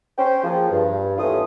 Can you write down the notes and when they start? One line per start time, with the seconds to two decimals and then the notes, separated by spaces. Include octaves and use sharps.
0.18 C#4 C5 G5
0.43 F3 A#3 G#4
0.71 G2
1.19 D#2 E3 A3 C#4 F4 D#6